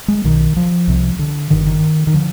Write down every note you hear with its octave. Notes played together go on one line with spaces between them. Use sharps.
G#3
B1 B2 D#3
F3
C2 C3
D3
G1 G2 D3 D#3
D#3
D#3
D3 F3